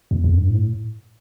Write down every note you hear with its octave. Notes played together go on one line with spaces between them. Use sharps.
E2
F2
G2
A2